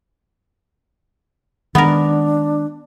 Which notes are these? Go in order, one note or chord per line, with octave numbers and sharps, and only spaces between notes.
D#3 G#3 B3 D4 A#4